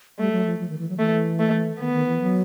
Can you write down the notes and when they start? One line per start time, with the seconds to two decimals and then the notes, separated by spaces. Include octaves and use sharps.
0.19 G3 A3
0.32 F#3
0.45 F3
0.59 F3
0.69 D#3
0.78 E3
0.89 F#3
0.99 E3 A3
1.39 A3
1.80 D#3 B3
1.93 D#3
2.06 E3
2.21 F#3